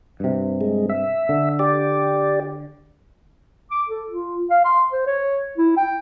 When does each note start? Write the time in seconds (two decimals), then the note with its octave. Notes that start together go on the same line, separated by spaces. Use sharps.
0.20 G2 C3
0.61 G#3
0.90 E5
1.29 D3
1.59 G4 D5
3.71 D6
3.88 A4
4.10 F4
4.50 F5
4.65 C6
4.92 C5
5.07 C#5
5.58 E4
5.77 G5